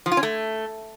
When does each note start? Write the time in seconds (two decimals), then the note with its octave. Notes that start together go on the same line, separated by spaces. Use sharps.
0.06 F3
0.12 F4
0.17 C#4
0.23 A3